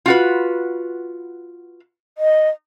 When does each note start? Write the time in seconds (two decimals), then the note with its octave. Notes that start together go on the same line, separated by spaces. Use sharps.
0.06 F4 F#4 B4
2.18 D#5